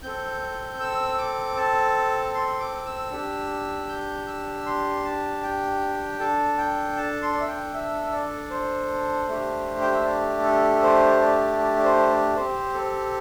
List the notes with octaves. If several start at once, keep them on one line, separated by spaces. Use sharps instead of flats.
C4 A4 G6
E6
D6
A5
C6
D6
E6
D4 G4
G6
E6
C6
A5
G5
D4 A4 A5
G5
A5
C6
D5
E5
G5
E5
D5
C5
A3 D4 G4
G5
E5
D5
A4
C5
D5
D5
D5
C5
D5
C4 G4 C5
A4